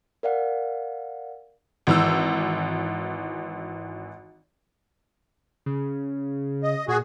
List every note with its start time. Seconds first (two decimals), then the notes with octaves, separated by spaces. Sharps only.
0.23 A#4 D5 F5 F#5
1.87 G#1 E3 E6
5.66 C#3
6.63 D#5
6.88 A#2 F#4 G#4